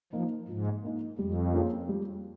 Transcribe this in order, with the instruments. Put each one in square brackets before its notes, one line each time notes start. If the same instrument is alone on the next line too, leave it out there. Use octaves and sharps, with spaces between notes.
[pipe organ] F3 [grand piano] A#3 D#4
[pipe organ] G#2 [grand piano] F3
[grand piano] A#3 D#4
[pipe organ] F2 [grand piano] G3
[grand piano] A#3 C#4 F4 G#4
G3